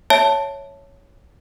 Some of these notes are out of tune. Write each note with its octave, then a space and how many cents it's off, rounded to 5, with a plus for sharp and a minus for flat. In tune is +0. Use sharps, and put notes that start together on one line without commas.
C#5 +0 E5 +0 A5 +0